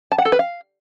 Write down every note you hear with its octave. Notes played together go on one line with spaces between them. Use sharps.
A5
F#5
A4
B4
F5